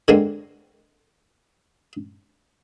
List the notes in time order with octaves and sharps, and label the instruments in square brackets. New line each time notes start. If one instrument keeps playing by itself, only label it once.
[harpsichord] D3 G#3 A#3 C4